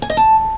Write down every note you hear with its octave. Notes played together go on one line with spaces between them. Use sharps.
G#5
D#5
A5